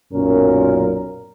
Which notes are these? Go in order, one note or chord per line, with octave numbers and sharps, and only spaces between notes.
B1 F#2 A#2 C#4 A#4